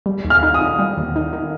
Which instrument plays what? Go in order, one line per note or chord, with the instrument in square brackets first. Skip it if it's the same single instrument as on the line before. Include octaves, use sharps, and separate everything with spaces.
[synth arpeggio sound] G3
D#2
[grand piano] F6
[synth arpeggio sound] D#4
[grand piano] D#6
[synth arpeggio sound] D#3
G3
D#2
D#4
D#3